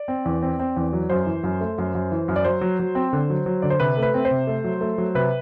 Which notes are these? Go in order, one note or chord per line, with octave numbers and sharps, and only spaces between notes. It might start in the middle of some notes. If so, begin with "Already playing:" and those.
Already playing: D5
C4
E2
C4
C4
E2
F#3
F#2 C5
E3
F#2
A3
F#2
F#2
E3
F#2
D5
F#3 C5
F#3
F#3
C4
D3
F#3
F#3
D3 D5
C5
C3 B4
A3
B4
C4
C5
C3
A3
F#3
A3
F#3
C3 B4